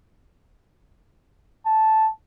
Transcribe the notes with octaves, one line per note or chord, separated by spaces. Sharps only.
A5